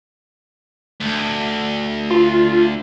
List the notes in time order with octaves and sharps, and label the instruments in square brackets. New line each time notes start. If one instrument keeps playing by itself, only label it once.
[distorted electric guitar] D2
[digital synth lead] F4